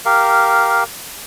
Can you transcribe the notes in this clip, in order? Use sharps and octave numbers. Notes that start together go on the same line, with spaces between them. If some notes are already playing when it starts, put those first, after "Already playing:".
G4 A#4 F5